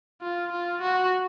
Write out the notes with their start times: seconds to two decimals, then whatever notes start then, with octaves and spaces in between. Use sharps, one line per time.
0.21 F4
0.52 F4
0.81 F#4